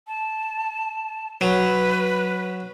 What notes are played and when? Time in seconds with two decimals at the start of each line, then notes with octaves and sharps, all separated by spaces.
0.08 A5
1.41 F#3 B4